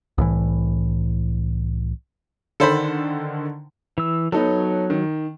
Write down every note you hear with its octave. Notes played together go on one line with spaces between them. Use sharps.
C2 A2 E3
D3 D#3 A4 C5 B5
E3 E6
F#3 B3 D#4 A4 C#5
D#3